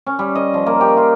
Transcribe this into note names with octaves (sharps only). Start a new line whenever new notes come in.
C#4
G3
D#5
F3
A#3
G4
F4